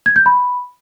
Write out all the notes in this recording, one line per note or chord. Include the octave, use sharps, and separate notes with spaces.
G#6
G6
B5